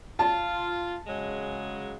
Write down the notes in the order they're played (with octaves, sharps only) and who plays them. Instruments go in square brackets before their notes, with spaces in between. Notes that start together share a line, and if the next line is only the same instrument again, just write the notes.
[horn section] F4 [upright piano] A5
[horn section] C#3 F#3 G#3